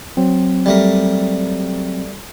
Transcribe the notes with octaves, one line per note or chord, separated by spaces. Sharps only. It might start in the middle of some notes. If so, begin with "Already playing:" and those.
F#3 C4
G3 A3 A#4